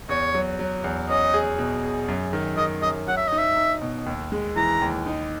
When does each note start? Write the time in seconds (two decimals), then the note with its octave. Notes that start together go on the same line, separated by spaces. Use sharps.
0.09 E2 C#5
0.34 F#3
0.59 F#3
0.84 E2
1.09 C#4 D#5
1.34 G#4
1.58 B2
1.83 G#4
2.08 F#2
2.33 D#3
2.57 D#3 D#5
2.82 F#2 D#5
3.08 F#3 F#5
3.17 E5
3.27 D#5
3.32 D#4
3.38 E5
3.56 D#4
3.82 B2
4.06 D#2
4.32 G#3
4.56 E3 A#5
4.81 D#2
5.06 D#4